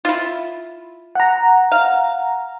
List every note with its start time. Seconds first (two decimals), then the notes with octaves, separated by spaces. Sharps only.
0.05 E4 F4
1.15 F#5 A#5
1.72 F5